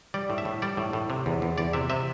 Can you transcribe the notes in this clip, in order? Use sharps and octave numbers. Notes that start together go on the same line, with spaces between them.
G3 D5
A2
E5
A2
G3 D5
A2
A2
C3
E2
E2
E2 D5
C3 E5
C3 E5